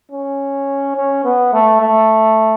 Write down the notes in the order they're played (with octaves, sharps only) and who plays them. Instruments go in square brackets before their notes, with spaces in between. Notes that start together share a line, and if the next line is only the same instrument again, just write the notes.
[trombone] C#4
C#4
B3
A3
A3